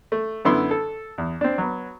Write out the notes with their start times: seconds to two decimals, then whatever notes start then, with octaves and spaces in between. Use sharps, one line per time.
0.12 A3
0.45 F#2 D3 B3 E4 C6 E6
0.71 A4
1.18 E2
1.41 C4 D4
1.58 F#3 B3